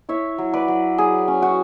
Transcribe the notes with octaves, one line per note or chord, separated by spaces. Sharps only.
E4 C#5 E5
F#3
B4 D5
F#3
F#3 G#4
C#4
F#4